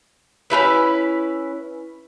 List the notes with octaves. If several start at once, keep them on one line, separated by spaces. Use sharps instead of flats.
C#4 D#4 E4 B4